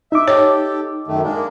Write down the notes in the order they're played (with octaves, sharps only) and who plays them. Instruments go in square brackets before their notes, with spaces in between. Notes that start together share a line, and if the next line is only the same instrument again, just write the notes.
[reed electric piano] D#4 D6 [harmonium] E5
[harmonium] G4 A4 [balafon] C#5
[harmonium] F#2 D#3 A3
G#3 A#3 D4